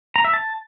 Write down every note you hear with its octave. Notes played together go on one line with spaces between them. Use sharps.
A#5
E5
A5